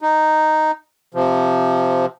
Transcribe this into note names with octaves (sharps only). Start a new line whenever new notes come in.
D#4
C3 F3